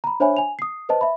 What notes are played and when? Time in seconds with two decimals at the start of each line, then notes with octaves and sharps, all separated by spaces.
0.04 A#5 B5
0.20 D4 C5 C#5 E5 G#5 B5
0.37 G#5 F7
0.59 D#6 C7
0.89 B4 C5 D#5 A5
1.01 E5 B5